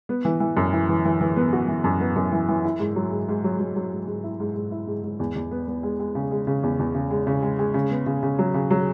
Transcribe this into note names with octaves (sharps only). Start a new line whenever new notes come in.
B3
E3
E3
F#2
E3
E3
E3
E3
B3
F#4
E3
F#2
B3
F#2
E3
E3
E4
G#2
F#3
G#2
G#2
F#3
F#3
F#3
G#2
G#2
E4
G#2
G#2
E4
G#2
G#2
E2
E2
B3
B3
G#3
G#3
C#3
G#3
C#3
E2
E2
C#3
G#3
C#3
G#3
G#3
C#3
B3
C#3
C#3
F#3
C#3
F#3